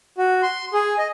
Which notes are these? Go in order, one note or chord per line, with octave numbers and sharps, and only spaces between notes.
F#4
C6
G#4
D#5